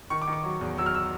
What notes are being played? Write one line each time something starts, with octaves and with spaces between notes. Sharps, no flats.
D#3 C#6
D6
D#3
D6
F#3
E2
F#3 E6
F6
E6